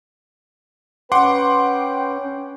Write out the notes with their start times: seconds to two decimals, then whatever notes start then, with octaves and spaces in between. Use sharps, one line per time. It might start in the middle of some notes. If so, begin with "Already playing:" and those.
1.12 C#4 B4 F#5 G5 C6 D6